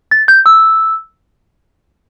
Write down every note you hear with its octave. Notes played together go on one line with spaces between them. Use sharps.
A6
G6
E6